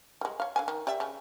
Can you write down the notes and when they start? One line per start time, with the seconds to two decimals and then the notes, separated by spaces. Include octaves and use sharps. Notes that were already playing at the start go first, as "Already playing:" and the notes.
0.21 G3 G#3
0.40 C#5 F5
0.56 D3 F5 G#5
0.68 D#3
0.87 G4 D5 E5
1.00 C#3